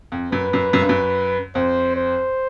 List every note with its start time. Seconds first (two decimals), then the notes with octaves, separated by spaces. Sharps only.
0.12 F2
0.32 F#2 B4
0.53 F#2
0.73 F#2
0.81 G2
0.89 F#2
1.55 F2 C5
1.96 C5